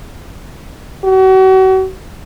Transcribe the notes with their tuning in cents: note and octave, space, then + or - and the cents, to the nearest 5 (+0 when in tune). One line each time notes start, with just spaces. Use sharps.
F#4 +35